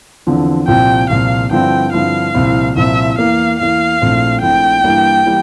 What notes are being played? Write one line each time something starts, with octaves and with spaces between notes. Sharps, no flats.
E2 D3 F3 C4
C2 A#2 F3 C4 G5
C2 A#2 F3 C4 F5
G2 D3 F3 C4 E4 G5
G2 D3 F3 C4 E4 F5
C2 A#2 F3 C4 E4
C2 A#2 F3 C4 E4 E5
E2 E3 A#3 F5
E2 E3 A#3 F5
A#1 A#2 A3 C4 E4
A#1 A#2 A3 C4 E4 G5
G2 E3 G3 A#3 E4
E3 G3 A#3